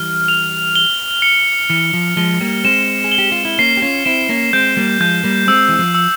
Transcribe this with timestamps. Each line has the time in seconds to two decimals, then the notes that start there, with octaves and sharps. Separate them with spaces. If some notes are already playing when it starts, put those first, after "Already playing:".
Already playing: E3 G3 F6
0.28 F7
0.75 G7
1.22 C#7
1.70 E3 C#7
1.94 F3
2.17 F3 G#3 G7
2.41 G3 A#3
2.64 G#3 C4 E7
3.04 G#4
3.12 G7
3.18 G4
3.32 F4
3.45 E4
3.58 A#3 C#4 C7
3.77 G4
3.82 C#4 F4
4.05 C4 E4 E7
4.29 A#3 C#4
4.53 G#3 C4 G6
4.77 G3 A#3
5.00 F3 G#3 G6
5.23 G3 A#3
5.47 G#3 C4 E6
5.69 E3
5.79 F3
5.95 E6